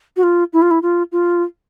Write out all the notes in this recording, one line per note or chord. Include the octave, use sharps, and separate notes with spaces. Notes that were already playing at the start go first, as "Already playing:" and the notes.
F#4
F4
E4
F4
E4
F4
F4